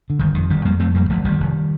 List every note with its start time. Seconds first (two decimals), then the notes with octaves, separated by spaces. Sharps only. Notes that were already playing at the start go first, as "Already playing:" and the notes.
0.10 D3
0.19 G1 D#3
0.34 F2 D#3
0.50 G1 D#3 G3
0.65 F2 G3 A#3
0.79 F2 A3 C4
0.94 F2 G3 A#3
1.10 G1 F3 A3
1.24 G1 D#3 G3
1.40 F1